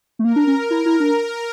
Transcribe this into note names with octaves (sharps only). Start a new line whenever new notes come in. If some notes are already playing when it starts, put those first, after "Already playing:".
A3
A#3 A#4
D4
C#4
E4
E4
D4